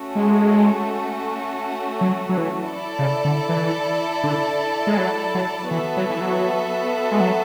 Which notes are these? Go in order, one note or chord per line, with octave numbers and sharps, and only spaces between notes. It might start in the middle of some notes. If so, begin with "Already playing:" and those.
Already playing: A3 C#4 F#4
G#3
F#3
F#3
E3
E4 A4 D5 A5
C#3
D3
E3
D3
G#3
F#3
F#3
E3 B3 F#4 A4 E5
F#3
E3
F#3
G#3
F#3